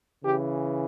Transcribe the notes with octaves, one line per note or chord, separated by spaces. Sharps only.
C#3 E3 G4